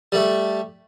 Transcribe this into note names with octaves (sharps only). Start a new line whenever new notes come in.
G3 A3